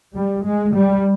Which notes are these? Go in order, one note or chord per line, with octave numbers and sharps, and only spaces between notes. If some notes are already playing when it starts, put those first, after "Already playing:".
G3
G#3
G3